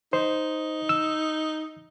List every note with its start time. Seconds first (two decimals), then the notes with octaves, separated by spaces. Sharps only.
0.13 D#4 C5
0.89 E6